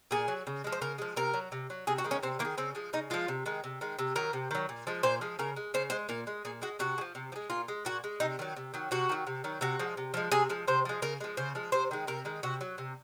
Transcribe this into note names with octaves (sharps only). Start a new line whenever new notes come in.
A#2 G#4
F#3
C#3
F3 G#3
C5
C#3 A#4
F3 G#3
C3 A#4
F#3
C3
F#3
C3 G#4
F#4
D#3 G#3
C#4
C3 C4
D#3 A#3
G#3
C#3 C4
F3 G#3
C#3 D#4
F3 G#3 F4
C3
D#3 G#3
C3
D#3 G#3
C3
D#3 F#3 A#4
C3
D#3 F#3
A#2
F3 G#3
A#2 C5
F3 G#3
C#3 A#4
G#3
C#3 C5
G#3 C5
A#2 A#4
G#3
A#2 G#4
G#3 F#4
C3 F#4
G#3
F3
C3
F3
G#3
A#2 F4
G#3
A#2 F#4
G#3
C3 D#4
D#3 F#3
C3
D#3 F#3
C3 F#4
D#3 F#3
C3
D#3 F#3
C3 F#4
F3 G#3
C3
F3 G#3
C3 G#4
F3 G#3
C3 C5
F3 G#3
C#3 A#4
F3 G#3
C#3 C5
F3 G#3
C3 C5
D#3 G#3
C3 A#4
D#3 G#3
C3 F#4
F#3
C3